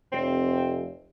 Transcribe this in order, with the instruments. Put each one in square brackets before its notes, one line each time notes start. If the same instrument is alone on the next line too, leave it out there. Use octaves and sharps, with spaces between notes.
[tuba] F1 [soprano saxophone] C4